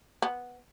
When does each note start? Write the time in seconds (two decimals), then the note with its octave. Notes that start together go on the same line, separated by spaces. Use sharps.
0.22 B3